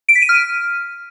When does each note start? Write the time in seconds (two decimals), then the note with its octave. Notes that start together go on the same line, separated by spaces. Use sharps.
0.09 D7
0.15 B6
0.22 D#7
0.29 F6